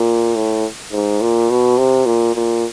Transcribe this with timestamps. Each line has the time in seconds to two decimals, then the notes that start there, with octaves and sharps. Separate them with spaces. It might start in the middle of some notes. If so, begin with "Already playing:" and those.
Already playing: A#2
0.36 A2
0.92 G#2
1.21 A#2
1.50 B2
1.78 C3
2.06 A#2
2.35 A#2